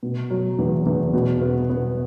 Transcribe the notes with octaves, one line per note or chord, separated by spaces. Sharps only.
B2
F#3
E2
E2
B2
B3
B3